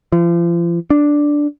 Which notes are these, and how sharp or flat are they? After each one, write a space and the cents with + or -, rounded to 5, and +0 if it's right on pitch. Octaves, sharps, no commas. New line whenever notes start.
F3 -40
D4 +0